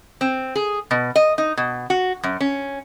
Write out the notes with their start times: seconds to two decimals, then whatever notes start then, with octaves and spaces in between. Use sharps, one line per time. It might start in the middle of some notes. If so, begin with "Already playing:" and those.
0.21 C4
0.55 G#4
0.91 B2
1.16 D#5
1.38 D#4
1.57 B2
1.90 F#4
2.23 F#2
2.40 C#4